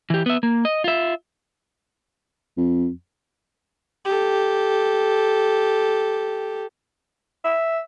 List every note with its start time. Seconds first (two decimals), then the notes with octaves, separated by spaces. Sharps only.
0.10 E3 G4
0.26 B3 E5
0.43 A#3
0.65 D#5
0.84 F4 E5
2.58 F2
4.05 G4 A4
7.44 E5